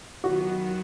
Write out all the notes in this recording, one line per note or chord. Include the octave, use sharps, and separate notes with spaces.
D#3 F#3 B3 F#4